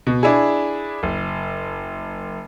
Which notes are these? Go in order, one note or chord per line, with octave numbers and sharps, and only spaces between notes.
B2
D4 E4 G#4
F#1